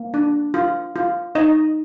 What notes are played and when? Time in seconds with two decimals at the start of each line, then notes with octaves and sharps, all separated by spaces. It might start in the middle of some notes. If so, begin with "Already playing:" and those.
Already playing: A#3
0.14 D4
0.54 F4
0.96 F4
1.35 D#4 D#5